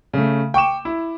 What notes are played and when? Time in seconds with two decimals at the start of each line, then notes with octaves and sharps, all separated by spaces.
0.14 C#3 A3
0.54 G5 C#6 D6 E7
0.85 E4